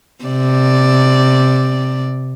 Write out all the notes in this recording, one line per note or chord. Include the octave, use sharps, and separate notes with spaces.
C3 D5